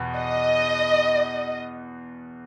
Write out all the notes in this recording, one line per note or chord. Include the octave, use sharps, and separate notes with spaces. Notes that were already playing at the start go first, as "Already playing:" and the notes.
Already playing: E2 B2 B3
D#5